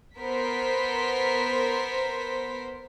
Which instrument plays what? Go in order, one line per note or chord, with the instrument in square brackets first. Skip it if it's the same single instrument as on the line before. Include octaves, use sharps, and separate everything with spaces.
[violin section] B3 A#4 C5 B6